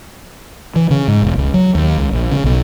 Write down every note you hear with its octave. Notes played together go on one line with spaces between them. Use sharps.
E3
C#3
G#2
E1
C#2
F#3
D#2
C#2
A#1
C#3
B1